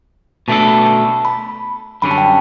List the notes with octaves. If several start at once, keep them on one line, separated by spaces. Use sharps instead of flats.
B2 A3 D4 A4 A5
B5
A5
B5
F#2 D3 G3 C#4 B5
A5
G5